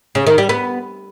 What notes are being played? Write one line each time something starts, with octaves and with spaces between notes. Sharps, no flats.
C#3
D#3
G3
B3